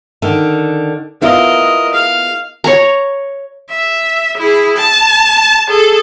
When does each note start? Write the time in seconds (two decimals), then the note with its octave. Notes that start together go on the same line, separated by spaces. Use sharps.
0.22 D3 D#3
1.22 B3 E4 F4 A#4 D#5
1.93 F5
2.64 C#5 A#5
3.69 E5
4.38 E4 G#4
4.77 A5
5.68 G#4 A4